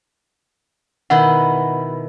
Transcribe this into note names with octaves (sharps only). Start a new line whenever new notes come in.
B2 D#3 E4 F#5